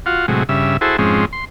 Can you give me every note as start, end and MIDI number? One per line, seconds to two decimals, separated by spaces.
0.06 0.26 65
0.06 0.26 66
0.28 0.43 45
0.28 0.43 48
0.28 0.43 54
0.28 0.43 56
0.49 0.77 43
0.49 0.77 49
0.49 0.77 76
0.81 0.97 64
0.81 0.97 66
0.81 0.97 68
0.81 0.97 69
0.81 0.97 72
0.98 1.25 41
0.98 1.25 44
0.98 1.25 56
0.98 1.25 60
0.98 1.25 61
1.33 1.45 84